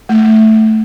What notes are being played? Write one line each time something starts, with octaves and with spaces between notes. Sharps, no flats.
A3